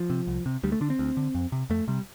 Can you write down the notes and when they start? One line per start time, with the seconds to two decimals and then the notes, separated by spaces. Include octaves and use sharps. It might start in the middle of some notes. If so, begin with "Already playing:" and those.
Already playing: F3
0.10 C3
0.27 C2
0.46 C3
0.63 D2 G3
0.72 A3
0.81 D3 D4
0.90 C4
0.99 D2
1.17 D3
1.35 F2
1.52 C3
1.70 F2 A3
1.88 C3 G3